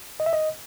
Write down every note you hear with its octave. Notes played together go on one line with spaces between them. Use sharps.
D#5
E5
D#5